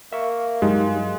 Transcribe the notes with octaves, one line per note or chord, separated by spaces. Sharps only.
A#3 E5 F5 C#6
G2 F#3 G#3 D#4 G4